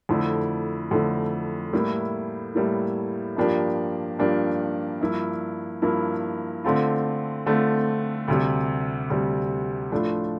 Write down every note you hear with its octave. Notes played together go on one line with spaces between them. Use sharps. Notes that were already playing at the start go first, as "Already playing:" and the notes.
F2 D3 A3 E4
F2 D3 A3 E4
A2 G3 A#3 E4
A2 G3 A#3 E4
G2 F3 A#3 D4 G4
G2 F3 A#3 D4 G4
G2 F3 A#3 E4
G2 F3 A#3 E4
D3 A3 C4 F4
D3 A3 C4 F4
D2 C3 G3
D2 C3 G3
A2 F3 A3 D4 F4